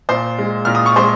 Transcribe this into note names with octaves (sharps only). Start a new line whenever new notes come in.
A#2 C5 C6
G#3
A#2 F6
D#6
C#6
G#3 C5 C6